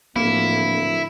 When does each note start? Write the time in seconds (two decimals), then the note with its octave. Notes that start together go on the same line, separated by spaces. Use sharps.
0.16 D1 A2 D3 F3 A#3 E4